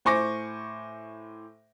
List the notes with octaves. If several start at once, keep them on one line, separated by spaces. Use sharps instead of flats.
A2 C5 G#5 C#6 D6 A#6